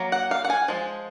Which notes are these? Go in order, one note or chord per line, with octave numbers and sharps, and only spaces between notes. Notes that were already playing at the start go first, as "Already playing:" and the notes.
Already playing: F#3 A#3
F#5
F5
F#5
G#5
F3 G#3